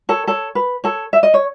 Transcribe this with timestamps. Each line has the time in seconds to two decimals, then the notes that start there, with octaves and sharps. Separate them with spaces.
0.09 A4 C#5
0.27 A4 C#5
0.55 B4
0.84 A4 C#5
1.13 E5
1.23 D#5
1.34 C#5